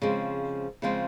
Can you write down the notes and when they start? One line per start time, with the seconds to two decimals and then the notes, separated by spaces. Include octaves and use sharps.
0.02 C#3 F3 G#3 C4
0.82 C#3 F3 G#3 C4